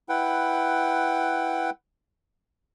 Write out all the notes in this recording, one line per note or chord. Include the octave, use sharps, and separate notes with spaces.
E4 B4 F#5 G5